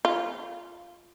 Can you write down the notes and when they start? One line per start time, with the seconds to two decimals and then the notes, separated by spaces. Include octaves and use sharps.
0.05 F4